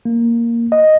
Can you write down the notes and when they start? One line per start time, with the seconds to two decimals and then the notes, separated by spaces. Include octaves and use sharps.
0.05 A#3
0.72 D#5